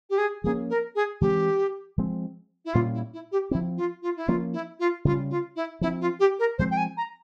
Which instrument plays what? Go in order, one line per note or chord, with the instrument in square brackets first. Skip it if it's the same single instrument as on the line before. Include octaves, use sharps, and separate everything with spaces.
[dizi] G4
G#4
[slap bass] F3 A#3 C#4 [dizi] G#4
[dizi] A#4
G#4
[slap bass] E3 G#3 C4 [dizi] G4
[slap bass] F3 G#3 C4
[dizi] E4
[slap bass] A#2 G3 A#3 C#4 [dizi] F4
[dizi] E4
E4
G4
[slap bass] F3 C4 [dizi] E4
[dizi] F4
F4
E4
[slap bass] F3 A#3 C#4 [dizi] F4
[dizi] E4
F4
[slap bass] C#3 G3 C#4 [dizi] F4
[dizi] F4
E4
[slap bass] F3 C4 [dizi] E4
[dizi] F4
G4
A#4
[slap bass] F3 G#3 C4 [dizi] C5
[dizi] G5
G#5
A#5